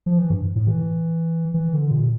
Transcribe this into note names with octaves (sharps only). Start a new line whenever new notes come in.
F3
E3
G2
A2
E3
E3
D3
A#2